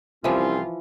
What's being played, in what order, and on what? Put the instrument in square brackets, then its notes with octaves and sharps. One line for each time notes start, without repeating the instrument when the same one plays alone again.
[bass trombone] C2 [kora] E3 F3 [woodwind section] C4 C#4 F4